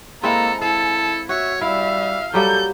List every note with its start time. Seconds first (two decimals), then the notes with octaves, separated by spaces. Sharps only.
0.23 G#3 A#3 C4 E4 A4 A#5
0.62 E4 A4 F5 A5
1.29 F#4 C#5 E5
1.61 G3 E4 E5 F5
2.34 F#3 G3 A#3 A4 G6